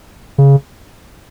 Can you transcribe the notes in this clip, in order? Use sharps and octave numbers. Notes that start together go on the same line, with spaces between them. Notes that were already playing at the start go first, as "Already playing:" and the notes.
C#3